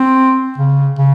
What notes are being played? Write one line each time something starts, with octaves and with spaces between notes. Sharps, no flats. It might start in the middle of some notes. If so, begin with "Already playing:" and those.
Already playing: C4
C#3
C#3